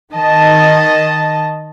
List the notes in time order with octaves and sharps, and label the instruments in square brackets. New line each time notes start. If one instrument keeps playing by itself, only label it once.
[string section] D#3 D#5 A5